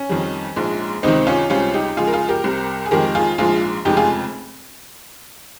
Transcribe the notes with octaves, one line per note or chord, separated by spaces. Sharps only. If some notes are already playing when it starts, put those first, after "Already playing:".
Already playing: C#4
F2 D#3 G3
A#1 G#2 F3 G#3
C#2 C3 D#3 C4 D#4
C#4 F4
C#2 C3 G3 C#4 F4
D#4 G4
C#2 C#3 F3 G#3 F4 G#4
A#4
F4 G#4
G4 A#4
C2 C3 G3
G#4
F2 D#3 G#3 G4 A#4
F4 G#4
A#1 G#2 F3 F4 G#4
F1 F2 C#3 G#3 D#4 G4
F4 G#4